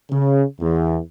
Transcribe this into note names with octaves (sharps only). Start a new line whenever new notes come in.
C#3
E2